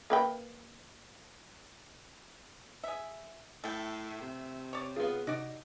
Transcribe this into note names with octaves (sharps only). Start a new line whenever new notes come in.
A#3 B4 G5
G#4 E5
A2 A3 G5
C3
C#5 D5
B3 F4 G#4
C3 D#4 F#4 D5